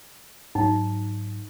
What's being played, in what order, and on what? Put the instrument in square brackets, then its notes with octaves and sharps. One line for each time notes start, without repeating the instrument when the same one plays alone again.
[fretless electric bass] G#2 F#3 [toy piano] D#4